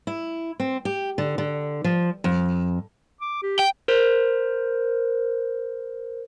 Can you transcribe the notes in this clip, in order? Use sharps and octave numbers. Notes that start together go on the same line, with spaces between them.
E4
C4
G4
D3
D3
F3
F2
D6
G4
G5
A#4 C5